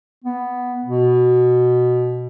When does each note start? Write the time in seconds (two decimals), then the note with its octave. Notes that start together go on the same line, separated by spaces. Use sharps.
0.24 B3
0.85 B2